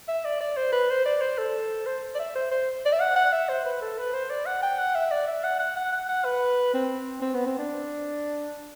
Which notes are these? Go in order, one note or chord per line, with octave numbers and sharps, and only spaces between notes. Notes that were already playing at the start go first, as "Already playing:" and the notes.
E5
D5
D5
C5
B4
C5
D5
C5
A4
C5
D5
E5
C5
C5
D5
E5
F#5
F#5
E5
C5
B4
A4
B4
C5
D5
F#5
G5
F#5
E5
D5
E5
F#5
F#5
F#5
F#5
F#5
B4
C4
C4
B3
C4
D4